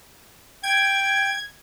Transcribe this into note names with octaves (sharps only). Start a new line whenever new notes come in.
G5 G#6